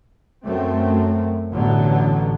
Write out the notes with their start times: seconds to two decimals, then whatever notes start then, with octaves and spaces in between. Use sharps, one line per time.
0.45 F#2 A3 C4
1.52 A1 B2 D3 F#3